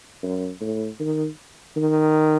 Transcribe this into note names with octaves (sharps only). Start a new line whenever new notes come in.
F#2
A2
D#3
D#3